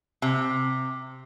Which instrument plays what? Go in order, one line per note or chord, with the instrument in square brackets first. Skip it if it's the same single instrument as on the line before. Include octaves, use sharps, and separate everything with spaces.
[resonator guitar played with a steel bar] C3